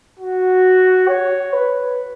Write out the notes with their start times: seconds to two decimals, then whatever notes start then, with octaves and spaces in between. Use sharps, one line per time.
0.19 F#4
1.08 C#5
1.53 B4